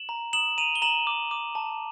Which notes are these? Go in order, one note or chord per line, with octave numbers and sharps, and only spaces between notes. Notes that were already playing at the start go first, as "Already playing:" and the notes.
Already playing: E7 F#7
A#5
D#6 E7 F#7
A#5 D#7 F7
G7
A#5 E7 F#7
D6
D6
A5